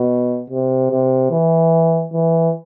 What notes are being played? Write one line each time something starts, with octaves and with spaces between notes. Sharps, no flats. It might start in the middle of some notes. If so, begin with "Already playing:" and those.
Already playing: B2
C3
C3
E3
E3